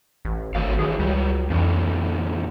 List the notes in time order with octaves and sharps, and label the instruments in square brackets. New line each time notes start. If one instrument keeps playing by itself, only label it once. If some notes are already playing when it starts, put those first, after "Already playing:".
[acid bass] A1
[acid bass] G#1 [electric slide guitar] F#3 A3 F5
[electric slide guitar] D#3 E3 F#3 [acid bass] G#4
[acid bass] C#2 [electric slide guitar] F#3 G3
[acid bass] F2 [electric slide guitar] A#2 D3 E3